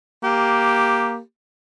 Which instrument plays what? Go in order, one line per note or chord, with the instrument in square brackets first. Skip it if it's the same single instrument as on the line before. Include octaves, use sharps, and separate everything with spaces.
[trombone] A#3 [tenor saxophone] G4